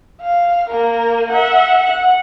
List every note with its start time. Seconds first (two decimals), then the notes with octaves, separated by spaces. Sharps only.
0.21 F5
0.70 A#3 A#4
1.31 E5 F#5
1.84 F#5